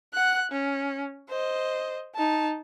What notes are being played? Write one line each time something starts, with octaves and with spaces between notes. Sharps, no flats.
F#5 F#6
C#4
C5 D#5
D#4 A5